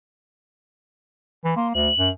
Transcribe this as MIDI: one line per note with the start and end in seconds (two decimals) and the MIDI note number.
1.45 1.52 52
1.56 1.73 58
1.56 1.68 84
1.74 1.89 38
1.74 2.08 102
1.99 2.10 42